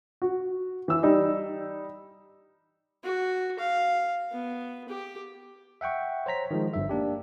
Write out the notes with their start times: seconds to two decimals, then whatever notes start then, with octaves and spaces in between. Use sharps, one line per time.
0.22 F#4
0.88 E3 E6
1.03 G3 D#4
3.04 F#4
3.59 F5
4.32 B3
4.89 G4
5.81 E5 F#5 G5 C#6
6.26 C5 C#5 A#5 B6
6.51 D#3 F3 G#3
6.74 G1 G2 E5
6.89 A#3 D4 G4